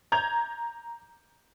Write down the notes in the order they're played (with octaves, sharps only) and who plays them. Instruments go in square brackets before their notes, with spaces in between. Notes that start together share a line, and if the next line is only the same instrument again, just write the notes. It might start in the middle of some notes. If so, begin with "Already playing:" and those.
[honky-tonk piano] A#5 G6 G#6 F7